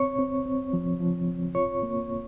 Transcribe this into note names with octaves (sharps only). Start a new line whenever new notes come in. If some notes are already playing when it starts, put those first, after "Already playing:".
Already playing: C4 C#5 C#6
C4
C4
F3
F3
C4
F4 C#5 C#6
A#3